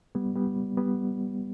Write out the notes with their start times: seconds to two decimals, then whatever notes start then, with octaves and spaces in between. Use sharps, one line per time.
0.15 G3 B3
0.35 G3 B3
0.77 G3 B3